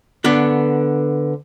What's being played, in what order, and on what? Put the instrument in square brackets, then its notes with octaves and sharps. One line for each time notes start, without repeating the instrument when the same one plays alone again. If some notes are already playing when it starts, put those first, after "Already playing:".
[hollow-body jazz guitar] D3 B3 D4